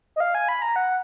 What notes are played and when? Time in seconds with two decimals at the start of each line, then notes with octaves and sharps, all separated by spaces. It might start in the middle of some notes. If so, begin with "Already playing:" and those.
0.16 D#5
0.20 F5
0.35 G#5
0.49 B5
0.62 A#5
0.76 F#5